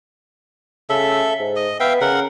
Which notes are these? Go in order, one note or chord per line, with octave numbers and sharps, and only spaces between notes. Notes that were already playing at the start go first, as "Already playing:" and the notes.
C#3 A4 E5
G#2
D#5
B3 E5 F5 G5
C#3 A#4 F#5